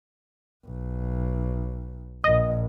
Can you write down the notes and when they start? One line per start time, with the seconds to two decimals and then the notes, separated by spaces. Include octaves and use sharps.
0.65 B1
2.24 A#1 D#5